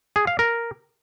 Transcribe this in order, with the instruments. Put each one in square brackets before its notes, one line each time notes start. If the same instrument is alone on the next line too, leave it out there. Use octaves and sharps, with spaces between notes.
[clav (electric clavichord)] G#4
F5
A#4